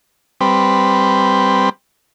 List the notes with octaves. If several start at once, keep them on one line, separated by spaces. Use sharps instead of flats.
G3 C4 B4